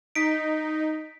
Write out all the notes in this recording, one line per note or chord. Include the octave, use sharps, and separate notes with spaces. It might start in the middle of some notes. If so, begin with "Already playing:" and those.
D#4 B6 D7